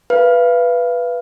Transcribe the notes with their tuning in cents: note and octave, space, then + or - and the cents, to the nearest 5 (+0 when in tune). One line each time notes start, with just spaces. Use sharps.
B4 -5 F5 -40